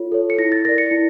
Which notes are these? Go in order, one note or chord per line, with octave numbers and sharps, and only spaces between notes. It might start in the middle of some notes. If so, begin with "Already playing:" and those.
Already playing: F4 A4 C#5
A4 C#5
C#7
E4 A#6
A6
A#4 D5 A#6
C#7
E4